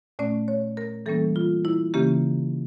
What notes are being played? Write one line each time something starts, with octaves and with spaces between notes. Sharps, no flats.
A#2 A3 C#4 D5
C#5
A#4
E3 G3 A#3 C#4 A4
F4
E4
C#3 E3 A#3 C#4 G4